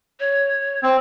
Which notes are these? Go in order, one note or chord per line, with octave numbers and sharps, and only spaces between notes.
C#5
C4